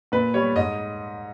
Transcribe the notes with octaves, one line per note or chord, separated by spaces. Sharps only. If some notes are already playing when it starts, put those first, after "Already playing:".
A#2 B4
G3 B3 C#5
G#2 D#5